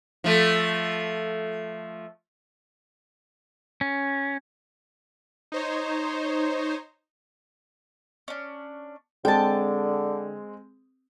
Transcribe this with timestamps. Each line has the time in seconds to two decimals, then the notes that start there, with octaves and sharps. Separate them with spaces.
0.24 F3 A3
3.81 C#4
5.52 D#4 C5 C#5
8.28 C#4 D4
9.25 D3 G#3 C4 G5 A5